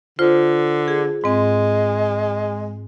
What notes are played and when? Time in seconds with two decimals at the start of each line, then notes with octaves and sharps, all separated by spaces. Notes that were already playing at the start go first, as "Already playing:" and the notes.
0.19 D3 F4 C5
0.88 G#4
1.24 G#2 G#3 C4